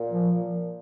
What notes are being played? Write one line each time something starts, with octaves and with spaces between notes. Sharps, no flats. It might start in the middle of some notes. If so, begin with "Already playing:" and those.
Already playing: A#2
F3